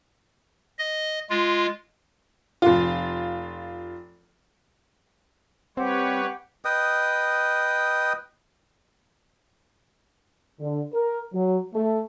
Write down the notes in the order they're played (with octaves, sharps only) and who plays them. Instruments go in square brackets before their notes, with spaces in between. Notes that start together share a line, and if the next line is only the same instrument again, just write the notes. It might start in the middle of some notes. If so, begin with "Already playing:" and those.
[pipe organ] D#5
G#3 F4
[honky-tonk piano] F1 F4
[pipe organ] G3 B4 C#5 [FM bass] C4 [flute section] G4 F#5 D6
[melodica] B4 D#5 G5 D#6
[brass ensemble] D3
A#4
F#3
A3